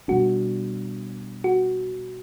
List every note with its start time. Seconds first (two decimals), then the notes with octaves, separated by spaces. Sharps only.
0.08 B2 G3 B3 D4 F#4
1.44 F#4